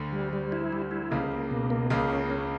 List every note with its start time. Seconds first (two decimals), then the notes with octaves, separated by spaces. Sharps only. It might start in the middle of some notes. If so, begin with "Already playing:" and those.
Already playing: D2 D3
0.13 G3
0.33 G3
0.52 E4
0.73 G3
0.91 E4
1.11 C#2 C#3 A#3
1.32 A#3
1.51 B2
1.70 A#3
1.90 C#2 C#3 A#3
2.10 C#4
2.30 C#4